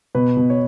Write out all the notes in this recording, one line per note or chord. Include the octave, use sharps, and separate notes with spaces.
B2 B4
B2
C#5